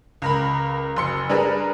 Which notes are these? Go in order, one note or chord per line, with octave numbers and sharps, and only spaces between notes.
C#2 A#4 B5
F#1 C6 C#7
G3 D4 G#4 A#4 B4